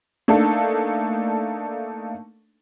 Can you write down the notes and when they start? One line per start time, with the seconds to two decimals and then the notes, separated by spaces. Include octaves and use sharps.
0.28 A3 A#3 D4 D#4 A4